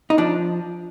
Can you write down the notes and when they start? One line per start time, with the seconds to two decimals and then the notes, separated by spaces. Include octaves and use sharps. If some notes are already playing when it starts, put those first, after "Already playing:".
0.10 D#4
0.18 F3 D4